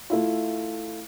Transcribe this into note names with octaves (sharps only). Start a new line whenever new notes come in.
A3 E4 F4